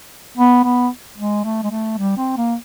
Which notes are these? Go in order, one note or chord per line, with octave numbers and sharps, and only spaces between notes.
B3
B3
G#3
A3
G#3
A3
G3
C4
A#3